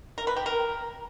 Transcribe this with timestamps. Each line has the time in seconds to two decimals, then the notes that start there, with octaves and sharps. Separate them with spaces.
0.18 A#4
0.27 B4
0.36 G4
0.46 A#4